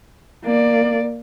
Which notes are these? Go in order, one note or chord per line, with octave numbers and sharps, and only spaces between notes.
A#3 D5